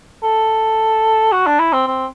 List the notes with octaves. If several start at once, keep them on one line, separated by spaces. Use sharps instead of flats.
A4
F#4
D4
E4
C4
C4